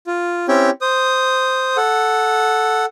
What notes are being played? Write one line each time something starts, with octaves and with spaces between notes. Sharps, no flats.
F4
C4 C#4 E4 G4 C#5 G5
C5 D#6
A4 F#5